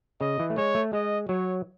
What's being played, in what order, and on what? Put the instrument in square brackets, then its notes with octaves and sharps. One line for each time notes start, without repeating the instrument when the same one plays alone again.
[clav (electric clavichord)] C#3 [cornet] D#5
[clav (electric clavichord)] E3
A3
[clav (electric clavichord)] G#3 [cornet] C#5
[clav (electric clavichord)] A3
[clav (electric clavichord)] G#3 [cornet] D#5
[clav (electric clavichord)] F#3 [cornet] C#5